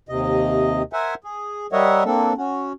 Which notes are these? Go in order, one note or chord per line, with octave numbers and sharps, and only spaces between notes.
D#2 C3 D#5
A#4 C5 E5 F#5 G#5
G#4
G3 A#4 C#5 D#5 E5 F#5
A#3 C4 D4 A4
C#4 F#4